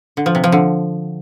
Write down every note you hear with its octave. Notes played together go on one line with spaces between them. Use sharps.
D3
F3
C3
F3
D3